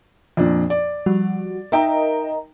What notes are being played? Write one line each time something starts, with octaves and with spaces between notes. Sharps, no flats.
F2 A#2 D4
D5
F3 G3 F#4
D#4 A#4 D#5 E5 G5 A#5